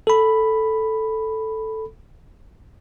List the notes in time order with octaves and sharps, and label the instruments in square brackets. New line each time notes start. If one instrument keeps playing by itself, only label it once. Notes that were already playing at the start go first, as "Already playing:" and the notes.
[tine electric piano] A4 B5